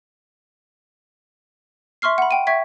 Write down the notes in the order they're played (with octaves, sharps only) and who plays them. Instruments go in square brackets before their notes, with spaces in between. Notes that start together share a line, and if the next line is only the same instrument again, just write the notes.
[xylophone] E5 C6 C#6 F6 C7
F#5 B5
G5 D#7
E5 G5 C#6 G#6 B6